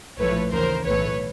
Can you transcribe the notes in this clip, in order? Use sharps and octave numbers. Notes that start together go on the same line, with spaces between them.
A#1 A2 F3 A3 B4 C#5
D#2 C#3 E3 A#4 C5
B1 A2 E3 A3 B4 C#5